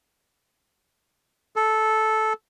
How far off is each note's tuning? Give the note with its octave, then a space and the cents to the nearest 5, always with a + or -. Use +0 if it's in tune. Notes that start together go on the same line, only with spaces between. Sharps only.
A4 -10